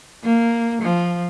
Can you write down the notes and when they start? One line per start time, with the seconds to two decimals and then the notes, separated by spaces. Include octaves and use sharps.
0.23 A#3
0.82 F3